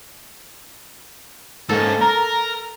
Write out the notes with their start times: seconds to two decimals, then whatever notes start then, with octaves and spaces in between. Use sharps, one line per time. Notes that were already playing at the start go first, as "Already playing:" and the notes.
1.69 G#2 A#3 C#4 A4
2.01 A#4 A#5